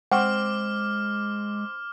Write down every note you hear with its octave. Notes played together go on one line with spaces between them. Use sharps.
G#3 C4 F#5 G5 C#6 D6 F6